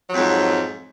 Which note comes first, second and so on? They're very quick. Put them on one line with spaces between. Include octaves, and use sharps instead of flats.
F#3 F2 G#2